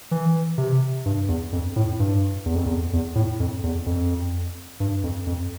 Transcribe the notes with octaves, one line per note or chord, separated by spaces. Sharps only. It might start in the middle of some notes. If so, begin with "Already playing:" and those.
E3
C3
G2
E2
F2
A2
G2
E2
F2
E2
E2
A2
F2
E2
F2
G2
F2
F2